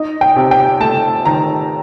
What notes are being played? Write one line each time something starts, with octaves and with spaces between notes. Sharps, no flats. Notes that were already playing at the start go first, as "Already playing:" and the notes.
Already playing: D#4 D#5
G5
C3
G5
A3 A5
D#3 A#5